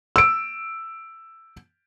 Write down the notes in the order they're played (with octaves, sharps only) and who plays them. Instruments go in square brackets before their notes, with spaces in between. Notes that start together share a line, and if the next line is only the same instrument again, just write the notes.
[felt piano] E6 D7